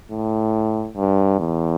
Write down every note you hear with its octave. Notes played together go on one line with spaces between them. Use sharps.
A2
G2
E2